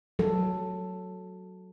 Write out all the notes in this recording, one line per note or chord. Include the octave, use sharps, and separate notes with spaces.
F#3 A4